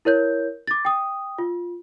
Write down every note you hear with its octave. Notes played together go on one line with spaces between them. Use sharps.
E4 A#4 C#5 G6
D6 A6
G5 D#6
F4